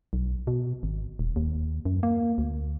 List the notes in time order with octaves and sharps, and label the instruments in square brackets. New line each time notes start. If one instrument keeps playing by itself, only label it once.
[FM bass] B1
B2
G#1
D#1
D#2
F#2
A#3
D2